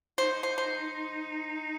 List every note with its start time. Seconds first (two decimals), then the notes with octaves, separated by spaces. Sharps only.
0.18 D#4 C5
0.43 C5
0.58 C5